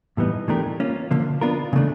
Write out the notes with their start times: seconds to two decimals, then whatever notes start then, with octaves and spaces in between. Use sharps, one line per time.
0.17 A2 E3 G3 B3 D#4
0.48 E3 A3 D4 G4 A#4
0.80 A#3 C#4 F4
1.11 D3 F3 A#3
1.41 B3 D4 F4 A#4
1.73 C#3 E3 A3 D4